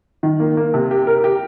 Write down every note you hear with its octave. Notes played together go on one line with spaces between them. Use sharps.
D#3
A#3
A#3
C3
G4
A#4
G4